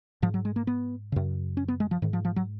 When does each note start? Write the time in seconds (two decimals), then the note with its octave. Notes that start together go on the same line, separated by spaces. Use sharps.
0.22 G#2 F3
0.34 F#3
0.45 G#3
0.56 A#3
0.67 B3
1.12 F#2 C#3
1.57 C#4
1.68 B3
1.80 G#3
1.91 F3
2.02 G#2 D#3
2.13 F3
2.25 F3
2.36 F#3